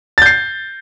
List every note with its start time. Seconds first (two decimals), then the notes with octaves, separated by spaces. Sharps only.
0.18 A6
0.22 G6
0.26 C7